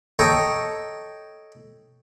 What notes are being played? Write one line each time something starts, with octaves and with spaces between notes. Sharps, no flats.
A4 C#5 D#5 G5 A#5